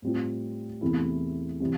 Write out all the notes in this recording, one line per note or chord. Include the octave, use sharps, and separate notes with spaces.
A2 G3 C4 F4
E2 C3 E3 A3 E4
C3 E3 G3